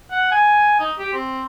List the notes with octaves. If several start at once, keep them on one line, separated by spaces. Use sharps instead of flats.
F#5
G#5
D#4
G4
C4